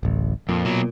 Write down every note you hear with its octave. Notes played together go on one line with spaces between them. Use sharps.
D1 A1
F2 A#2
B2 F#3